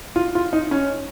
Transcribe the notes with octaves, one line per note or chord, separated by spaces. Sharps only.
F4
F4
D#4
C#4